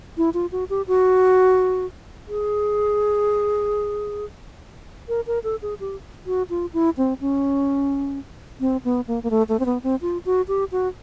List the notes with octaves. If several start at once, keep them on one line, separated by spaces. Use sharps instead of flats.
E4
F4
F#4
G4
F#4
G#4
A#4
A#4
A4
G#4
G4
F#4
F4
E4
C4
C#4
C4
B3
A#3
A#3
A3
A3
C4
B3
C4
F4
F#4
G4
F#4